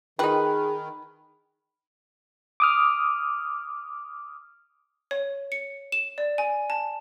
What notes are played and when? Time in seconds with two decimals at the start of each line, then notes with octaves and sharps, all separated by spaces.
0.19 D#3 D#4 F4 G#4 B4 G5
2.60 D6 D#6 F6
5.11 C#5
5.52 C#7
5.92 E7
6.18 D5
6.38 G#5
6.70 A5